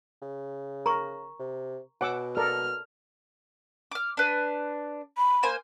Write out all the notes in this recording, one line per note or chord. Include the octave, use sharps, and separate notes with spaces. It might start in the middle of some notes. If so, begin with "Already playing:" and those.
C#3
A#4 A#5 C#6
C3
B2 C#5 F#5 G#5 D6 E6
A4 A#4 D5 F6
D6 F6
D4 B4
B5
A#3 C5 G#5